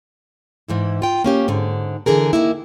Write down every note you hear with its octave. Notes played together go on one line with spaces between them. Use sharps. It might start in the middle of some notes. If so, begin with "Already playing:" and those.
G#2 E3 E4
F4 G5
A#3 C#4 G4
G#2 D3
D3 E3 G#4 A#4
D#3 A#3 E4